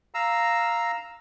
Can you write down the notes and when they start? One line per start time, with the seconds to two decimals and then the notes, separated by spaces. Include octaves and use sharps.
0.14 F5 A#5 E6